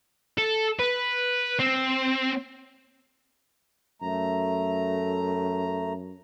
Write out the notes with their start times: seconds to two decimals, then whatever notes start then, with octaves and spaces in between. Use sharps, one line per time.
0.38 A4
0.79 B4
1.59 C4
4.02 F#2 A3 A#5